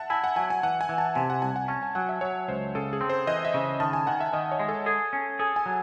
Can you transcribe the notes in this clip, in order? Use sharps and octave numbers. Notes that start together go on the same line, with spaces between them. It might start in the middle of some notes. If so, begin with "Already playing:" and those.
Already playing: E5 F#5 A5
E4 G#5
F#5
F#3 G#5
G#5
E3 F#5
G#5
E3
A5
C3 G#5
F#5
C2 G#5
F#5
C#4 A5
G#5
F#3 F#5
E5
F#3 C#5
C#2 C5
C#3 A4
G#4
C4
C5
E3 D#5
E5
C#3
D#3 A5
G#5
D#3 F#5
E5
D#3 D#5
C#5
G#3
A4
G#4 A4
C#4
G#4 A4
G#5
F#3